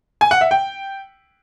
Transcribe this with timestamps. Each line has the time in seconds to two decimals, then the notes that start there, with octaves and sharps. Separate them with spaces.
0.21 G#5
0.31 F#5
0.41 E5
0.51 G5